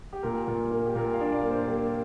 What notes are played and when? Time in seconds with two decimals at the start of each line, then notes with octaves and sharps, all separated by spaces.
0.13 G4
0.23 A#2 A#4
0.47 A#2
0.71 A#3
0.86 G4
0.95 A#2 A#4
1.13 F5
1.20 D4
1.32 D5
1.43 A#3
1.50 C5
1.68 A#3 G4